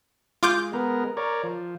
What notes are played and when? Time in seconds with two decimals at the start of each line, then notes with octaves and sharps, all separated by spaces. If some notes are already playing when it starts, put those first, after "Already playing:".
0.43 G#3 F4 D6 G6
0.73 G#3 B3 A#4
1.17 A#4 C#5 D5
1.43 F3